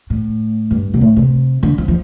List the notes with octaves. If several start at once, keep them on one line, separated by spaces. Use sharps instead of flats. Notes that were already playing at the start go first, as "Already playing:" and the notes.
A2
G2
C3
A2
C3
D3
F3
F3